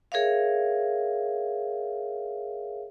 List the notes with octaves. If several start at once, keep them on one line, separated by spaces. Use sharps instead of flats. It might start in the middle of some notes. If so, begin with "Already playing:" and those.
G#4 A#4 C#5 E5 F5